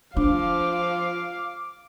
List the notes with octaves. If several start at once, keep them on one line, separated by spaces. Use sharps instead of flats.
F3 D4 F5 D6